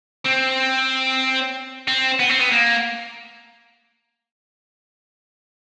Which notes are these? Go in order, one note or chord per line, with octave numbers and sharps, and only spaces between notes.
C4
C4
B3
C4
B3
A#3